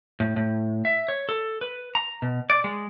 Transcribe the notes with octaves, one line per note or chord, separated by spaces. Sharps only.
A2
A2
E5
C#5
A4
B4
A#5
B2
D5
G#3